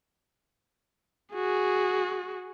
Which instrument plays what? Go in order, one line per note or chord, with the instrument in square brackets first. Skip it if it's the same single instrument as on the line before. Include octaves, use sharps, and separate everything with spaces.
[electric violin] F#4 G#4